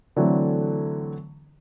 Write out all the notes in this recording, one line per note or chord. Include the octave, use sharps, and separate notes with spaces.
D3 E3 F#3 A3 C4